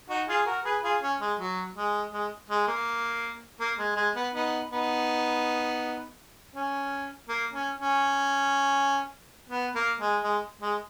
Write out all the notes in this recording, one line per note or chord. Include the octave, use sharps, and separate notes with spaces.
D#4 F#4
F4 G#4
F#4 A#4
G#4 B4
F4 G#4
C#4
G#3
F#3
G#3
G#3
G#3
A#3
A#3
G#3
G#3
B3
B3 D#4
B3 D#4
C#4
A#3
C#4
C#4
B3
A#3
G#3
G#3
G#3